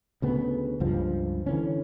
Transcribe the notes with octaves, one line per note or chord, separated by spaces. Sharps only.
D2 C#3 B3
C#2 G2 F3
D3 E3 C#4